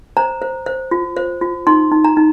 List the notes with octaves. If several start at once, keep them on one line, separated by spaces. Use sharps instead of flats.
C5 A#5
C5
C5
F4
C5
F4
D#4 C6
D#4
A#5
D#4